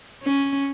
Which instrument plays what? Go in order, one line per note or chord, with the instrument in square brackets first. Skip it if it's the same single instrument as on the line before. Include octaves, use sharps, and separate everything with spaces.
[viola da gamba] C#4